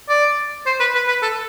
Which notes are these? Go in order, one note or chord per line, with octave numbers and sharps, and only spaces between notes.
D5
C5
B4
B4
B4
A4